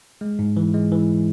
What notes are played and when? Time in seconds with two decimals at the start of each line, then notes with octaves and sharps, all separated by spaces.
0.21 G#3
0.39 G#2
0.57 E3
0.74 G#3
0.91 E3